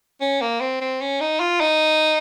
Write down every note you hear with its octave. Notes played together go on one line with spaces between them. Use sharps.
C#4
A#3
C4
C4
C#4
D#4
F4
D#4